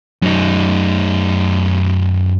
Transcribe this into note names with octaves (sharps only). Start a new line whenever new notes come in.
F#2 D#4